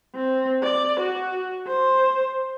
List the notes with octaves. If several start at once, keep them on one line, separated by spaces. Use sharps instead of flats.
C4
D5
F#4
C5